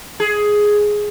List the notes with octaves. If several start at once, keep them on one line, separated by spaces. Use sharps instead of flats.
G#4